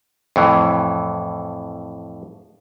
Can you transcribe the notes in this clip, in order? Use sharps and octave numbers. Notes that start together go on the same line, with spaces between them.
F2 A2 E3